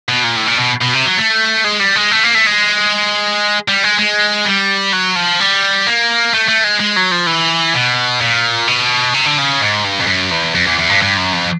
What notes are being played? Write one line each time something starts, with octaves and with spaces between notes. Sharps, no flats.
B2
A#2
A2
A#2
B2
B2
C3
F#3
A3
G#3
G3
G#3
A3
A#3
A3
G#3
G3
G#3
G#3
G3
F#3
F3
G3
A#3
A3
A3
G#3
G#3
F#3
F3
E3
B2
A#2
B2
C3
D3
C#3
G#2
G2
F2
F#2
E2
F2
E2
E2
G2
G2
F#2
F2